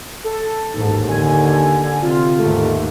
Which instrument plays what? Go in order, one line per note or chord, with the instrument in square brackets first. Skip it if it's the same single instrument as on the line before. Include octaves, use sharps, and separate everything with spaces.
[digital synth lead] A4
[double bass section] A1 G#2 [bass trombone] D#2
[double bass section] D3 [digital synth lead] G#5
[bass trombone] C3 [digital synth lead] F4
[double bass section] D#2 G#2 [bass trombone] A3